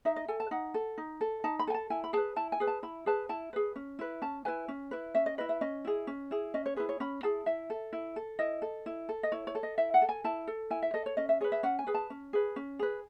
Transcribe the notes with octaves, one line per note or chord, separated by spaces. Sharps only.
D#4 E5
D#5
A4 G#5
A5
D#4 F#5
A4
D#4
A4
D#4 A5
B5
A4 G#5
A5
E4 G#5
B5
G#4 B4 A5
E4 A5
G#5
G#4 B4
A5
E4 B5
G#4 B4 A5
E4 A5
G#4 B4
C#4
E4 B4
C#4 A5
E4 B4 G#5
C#4
E4 B4
C#4 E5
D#5
E4 B4 D#5
E5
C#4 D#5
E4 G#4
C#4
E4 G#4
C#4 D#5
C#5
E4 G#4 B4
C#5
C#4 B5
E4 G#4 A5
E4 E5
A4
E4
A4
E4 D#5
A4
E4
A4
D#5
E4 C#5
C#5
A4
D#5
E4 E5
F#5
A4
G#5
E4 A5
A4
E4 G#5
E5
A4 D#5
C#5
C#4 D#5
E5
G#4 B4 C#5
E5
C#4 F#5
G#5
G#4 B4
A5
C#4
G#4 B4
C#4
G#4 B4